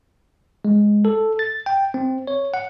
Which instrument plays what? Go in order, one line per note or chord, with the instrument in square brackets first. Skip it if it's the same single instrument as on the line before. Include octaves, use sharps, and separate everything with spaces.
[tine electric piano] G#3
A4
A6
G5
C4
C#5
F#5